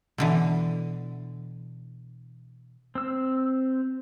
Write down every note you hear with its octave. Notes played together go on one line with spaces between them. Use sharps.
B2 D3 E3
C4 E6